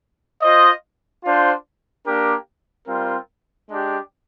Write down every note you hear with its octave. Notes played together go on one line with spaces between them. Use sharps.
F4 C5 D#5
D4 F4 C5
A#3 D4 G4 A#4
G3 C4 F4 A#4
G#3 D4 G4